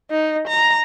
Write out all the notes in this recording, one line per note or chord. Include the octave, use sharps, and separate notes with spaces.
D#4
A#5